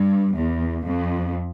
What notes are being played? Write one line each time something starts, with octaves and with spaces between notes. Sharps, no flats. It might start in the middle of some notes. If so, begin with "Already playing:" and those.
Already playing: G2
E2
F2